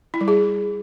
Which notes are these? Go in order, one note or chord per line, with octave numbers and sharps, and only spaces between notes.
E4
G3
G#4